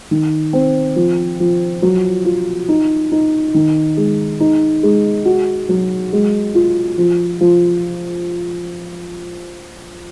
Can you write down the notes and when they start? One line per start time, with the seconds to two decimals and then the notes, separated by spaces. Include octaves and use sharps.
0.11 D#3
0.53 C4
0.96 F3
1.40 F3
1.82 F#3
2.25 F4
2.69 D#4
3.12 D#4
3.54 D#3
3.97 G#3
4.40 D#4
4.83 G#3
5.25 F#4
5.69 F#3
6.12 G#3
6.55 F4
6.98 F3
7.41 F3